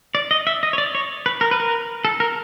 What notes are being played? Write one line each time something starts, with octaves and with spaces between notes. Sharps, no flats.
D5
D#5
E5
D#5
C#5
D5
C#5
B4
A#4
B4
A#4
A4
A#4